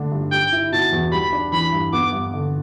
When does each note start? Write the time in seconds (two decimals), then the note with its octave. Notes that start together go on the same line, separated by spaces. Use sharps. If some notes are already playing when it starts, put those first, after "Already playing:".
Already playing: D3 A3 D4
0.12 G2
0.32 G3 G5
0.52 E4
0.72 B2 A5
0.92 E2
1.12 G3 B5
1.32 D4
1.52 E3 B5
1.72 G2
1.93 B3 D6
2.12 G2
2.33 D3